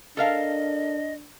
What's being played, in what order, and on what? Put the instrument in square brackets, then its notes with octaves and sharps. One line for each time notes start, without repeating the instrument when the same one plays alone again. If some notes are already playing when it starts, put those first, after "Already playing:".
[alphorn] D4 [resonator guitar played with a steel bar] A4 A#4 F5 [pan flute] D#5